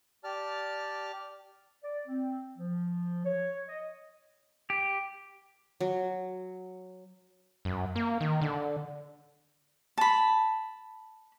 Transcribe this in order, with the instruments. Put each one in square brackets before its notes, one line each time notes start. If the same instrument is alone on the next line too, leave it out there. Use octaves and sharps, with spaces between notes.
[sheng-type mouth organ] G4 D5 A5 F6
[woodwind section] D5
C4
F3
C#5
D#5
[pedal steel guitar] G4
[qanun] F#3
[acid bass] F#2
A#3
D#3
D3
[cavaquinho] A5 B5